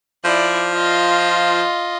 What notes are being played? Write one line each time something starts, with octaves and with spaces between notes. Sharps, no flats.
F3 E4 D5
F4 D#5